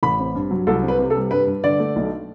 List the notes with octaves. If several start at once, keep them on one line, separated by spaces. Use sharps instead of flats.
A1 B5
C4
G2
F#3
C2 A4
C4
B4
C3
A4
G3
G2 B4
G2
D3 D5
A3
B1